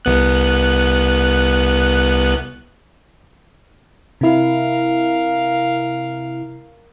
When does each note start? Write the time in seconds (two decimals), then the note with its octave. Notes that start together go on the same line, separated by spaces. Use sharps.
0.05 C2 B3 F#6
4.21 C3 E4 A#4 F5